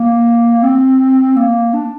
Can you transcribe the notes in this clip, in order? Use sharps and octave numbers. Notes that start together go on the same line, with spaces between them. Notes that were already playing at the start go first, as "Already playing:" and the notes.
Already playing: A#3
C4
A#3
D4